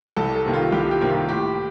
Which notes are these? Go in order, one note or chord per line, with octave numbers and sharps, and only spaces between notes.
C2 A4
A4
C3 D#3 A#3
F4
C2 G4
G4
C3 D#3 A#3
F4
A2 G4